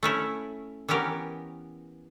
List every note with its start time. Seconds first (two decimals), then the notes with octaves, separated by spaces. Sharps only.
0.03 A3 C#4 E4
0.88 E3 B3 C#4 G4 A#4